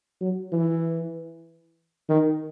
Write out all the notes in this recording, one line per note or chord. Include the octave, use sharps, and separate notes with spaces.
F#3
E3
D#3